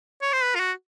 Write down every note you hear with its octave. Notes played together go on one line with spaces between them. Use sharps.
C#5
C5
B4
F4
F#4